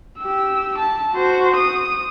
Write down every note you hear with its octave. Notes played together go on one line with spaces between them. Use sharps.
G4 E6
A5
F#4 C5
D#6